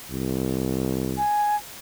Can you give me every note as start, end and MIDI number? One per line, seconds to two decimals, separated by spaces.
0.11 1.21 36
1.18 1.56 80